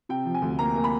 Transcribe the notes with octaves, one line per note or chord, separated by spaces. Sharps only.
C3 G5
F3
G#5
D2
A#3 A#5
A#3
B5